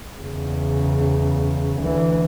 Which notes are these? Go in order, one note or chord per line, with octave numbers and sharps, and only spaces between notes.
E2 C#3
D2 E3